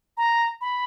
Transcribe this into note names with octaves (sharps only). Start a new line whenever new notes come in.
A#5
B5